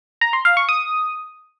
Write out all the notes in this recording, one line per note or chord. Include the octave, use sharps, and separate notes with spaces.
A#5
C6
F5
C#6
D#6